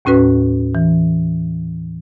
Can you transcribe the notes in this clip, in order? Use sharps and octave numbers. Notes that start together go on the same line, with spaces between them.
D#2 A2 C#4 F#4 B4
E3